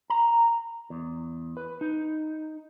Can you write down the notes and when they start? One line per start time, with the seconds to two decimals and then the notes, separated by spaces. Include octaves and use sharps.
0.10 A#5
0.90 E2
1.57 B4
1.81 D#4